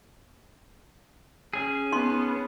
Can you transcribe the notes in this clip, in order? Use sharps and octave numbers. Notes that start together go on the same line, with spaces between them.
C#4 G#4
B3 D#4 C6